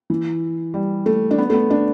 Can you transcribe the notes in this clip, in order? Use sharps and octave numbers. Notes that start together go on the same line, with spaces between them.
E3
G3
A3
D4
B3
A3
B3
D4